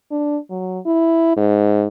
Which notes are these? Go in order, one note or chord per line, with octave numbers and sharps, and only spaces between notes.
D4
F#3
E4
G#2